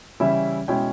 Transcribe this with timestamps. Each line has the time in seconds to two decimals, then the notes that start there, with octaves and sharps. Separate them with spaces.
0.20 C#3 E3 G3 C#4 E4 E5
0.68 B2 G#3 C#4 E4 G5